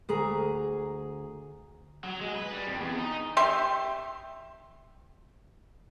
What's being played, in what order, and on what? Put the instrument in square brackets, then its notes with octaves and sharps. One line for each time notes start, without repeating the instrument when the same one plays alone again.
[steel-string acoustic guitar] D2 G#4 A#5
[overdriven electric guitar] F#3
G#3
B4
G3
F2
E2
D#4
[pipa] G4 E5 C6